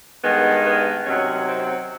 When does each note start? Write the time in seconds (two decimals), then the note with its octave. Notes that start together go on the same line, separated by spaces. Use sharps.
0.23 G2 D#3 G#3 B3
0.64 B3
1.05 C3 D#3 F#3 C#4
1.47 C4